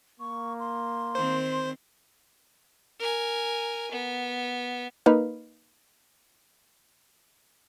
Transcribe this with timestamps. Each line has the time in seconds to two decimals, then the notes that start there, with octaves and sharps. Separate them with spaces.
0.20 A#3 C#6
0.60 C6
1.15 D#3 C4 C5
2.99 A#4 G#5
3.92 B3
5.06 A#3 D#4 B4 F5